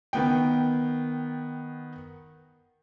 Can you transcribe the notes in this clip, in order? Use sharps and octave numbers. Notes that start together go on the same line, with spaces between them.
D#3 B3 G5